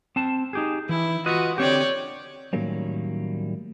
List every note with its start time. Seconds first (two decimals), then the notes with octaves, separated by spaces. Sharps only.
0.16 C4 A5
0.53 D#4 G4 G#4
0.89 E3 E4
1.26 F4 F#4 B4 D#5
1.58 D3 C4 G4 C#5 D5
2.53 A2 D#3 F#3 G3 A#3 C#4